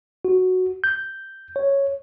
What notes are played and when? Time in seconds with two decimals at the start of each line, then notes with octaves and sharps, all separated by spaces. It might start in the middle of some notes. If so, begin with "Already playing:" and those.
0.25 F#4
0.84 G6
1.56 C#5